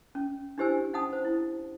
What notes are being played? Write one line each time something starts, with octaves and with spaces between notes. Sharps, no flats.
C#4
D4 E4 G4 C5 G#5 E6
C#4 D#4 F#5 A5 B5 D#6
C5
E4